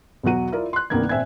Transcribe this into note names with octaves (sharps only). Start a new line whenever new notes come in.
B1 E2 F#3 F#4 D#7
E4 F4 A#4 D5
C6 F#6
C2 G2 D#3 A#3 B3 G#6
A#1 C4 E5 G#5 G#6